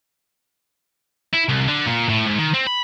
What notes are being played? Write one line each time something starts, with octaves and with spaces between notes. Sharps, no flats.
E4
C2
D3
A#2
A2
G#2
D#3
C4
B5